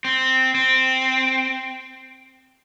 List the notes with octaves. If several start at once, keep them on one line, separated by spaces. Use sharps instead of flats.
C4
C4